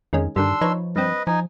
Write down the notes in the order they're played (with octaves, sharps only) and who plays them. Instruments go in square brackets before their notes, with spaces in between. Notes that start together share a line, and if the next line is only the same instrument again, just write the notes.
[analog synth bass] F2 [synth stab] D#3 G#3 C#4
[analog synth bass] G2 [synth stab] D3 D#3 G3 [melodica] D4 C6 E6
[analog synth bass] F3 [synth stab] D#4 B4 C#5
[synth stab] G2 C4 [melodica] B4 D#5
[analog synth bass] F3 [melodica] D#4 G#5